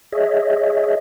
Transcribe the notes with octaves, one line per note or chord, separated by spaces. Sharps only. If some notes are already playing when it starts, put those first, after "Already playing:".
G#4 C#5 D#5 E5